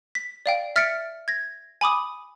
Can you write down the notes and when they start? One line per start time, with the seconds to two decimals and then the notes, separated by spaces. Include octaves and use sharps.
0.15 B6
0.46 D5 F5 G5
0.76 E5 F6 A6 B6 C#7 D7
1.28 G#6 A#6
1.81 G#5 B5 D6 D#6